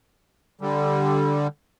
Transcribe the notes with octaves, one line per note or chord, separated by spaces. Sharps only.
D3 G3